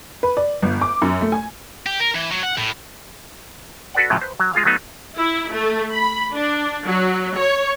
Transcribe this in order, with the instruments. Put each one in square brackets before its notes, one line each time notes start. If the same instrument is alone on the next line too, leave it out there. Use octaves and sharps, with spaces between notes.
[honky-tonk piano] B4
D5
G1
D6
F#2
A3
G#5
[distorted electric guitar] G4
A#4
E3
F#3
F#5
A2
[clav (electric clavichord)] F#4 A4 B4 D5 F#5
A2 C#3 F3 F#3
B4 C5
F#3
G#3 F4 G#4 F5
F#3 A3 B3 D#4
[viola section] E4
A3
B5
D4
F#3
C#5